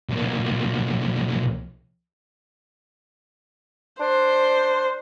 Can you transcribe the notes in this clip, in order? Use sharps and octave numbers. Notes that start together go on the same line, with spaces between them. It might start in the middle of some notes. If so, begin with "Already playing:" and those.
B1 A#2
D4 C5